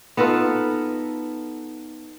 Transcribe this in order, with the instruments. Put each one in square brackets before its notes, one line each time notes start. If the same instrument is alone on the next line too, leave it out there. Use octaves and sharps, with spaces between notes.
[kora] B3 F4 [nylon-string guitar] D#4 A4 B4